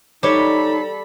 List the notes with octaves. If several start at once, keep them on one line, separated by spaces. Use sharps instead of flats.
G3 D#4 G4 A4 C5 C#5 B5